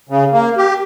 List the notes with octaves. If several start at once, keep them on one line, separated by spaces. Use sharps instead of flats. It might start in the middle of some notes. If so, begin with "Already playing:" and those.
C#3
A#3
G4